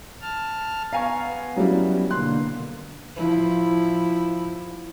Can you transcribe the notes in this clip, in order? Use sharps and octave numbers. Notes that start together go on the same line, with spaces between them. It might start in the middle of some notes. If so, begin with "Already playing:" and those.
A5 F6
B3 F5 G#5 A#5 C#6
F#3 G3 C#4 E4
B2 D3 A#3 C6 F#6
F3 E4